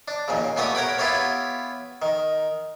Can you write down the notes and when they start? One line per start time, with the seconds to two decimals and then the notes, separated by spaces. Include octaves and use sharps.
0.08 D4
0.28 D#2 A#2 C#3
0.56 A#2 A3 B3 G4 C#6 D#6
0.75 A#4 C#5 F#5 G5 B5
0.98 B3 E4 F4 G4 C#5
2.02 D#3